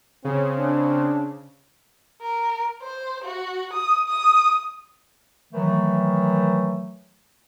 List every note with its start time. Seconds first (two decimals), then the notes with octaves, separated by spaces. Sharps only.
0.25 C#3 C4
0.56 D4
2.21 A#4
2.82 C5
3.24 F#4
3.73 D#6
4.09 D#6
5.53 D#3 E3 F#3 A3